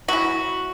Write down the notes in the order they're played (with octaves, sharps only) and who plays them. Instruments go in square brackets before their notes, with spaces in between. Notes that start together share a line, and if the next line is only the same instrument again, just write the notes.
[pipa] F#3 C#4 E4 F#4